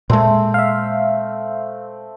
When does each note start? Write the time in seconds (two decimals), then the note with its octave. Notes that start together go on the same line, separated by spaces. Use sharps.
0.10 A#2 G#3 A3 C4
0.54 E5 F5